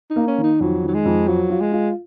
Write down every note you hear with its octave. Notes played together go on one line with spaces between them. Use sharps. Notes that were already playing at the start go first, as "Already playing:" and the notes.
D#4
A#3
C#4
D#3
D#4
F2 F#3
D#3
F#3
G#3
F2
F3 F#3
F4
G#3
F4